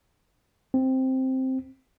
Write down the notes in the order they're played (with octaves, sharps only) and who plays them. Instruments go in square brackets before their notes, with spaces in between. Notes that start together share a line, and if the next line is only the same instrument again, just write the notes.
[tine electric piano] C4